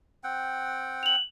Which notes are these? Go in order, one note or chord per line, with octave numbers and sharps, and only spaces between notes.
C4 F#5 G5
F7 F#7